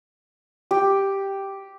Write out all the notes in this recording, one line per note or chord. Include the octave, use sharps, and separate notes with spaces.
G4